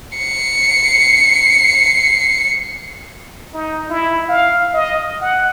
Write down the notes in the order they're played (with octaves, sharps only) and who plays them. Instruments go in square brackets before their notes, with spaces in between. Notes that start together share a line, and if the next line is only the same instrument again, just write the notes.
[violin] C7 C#7
[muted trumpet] D#4
E4
F5
D#5
F#5